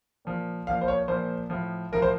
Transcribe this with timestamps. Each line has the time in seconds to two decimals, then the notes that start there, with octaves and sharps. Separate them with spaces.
0.25 A#2 F3
0.67 A#2 F3 F5
0.82 C5
0.88 C#5
1.08 A#2 F3 C5
1.50 A2 F3
1.92 A2 F3 A#4
2.02 C5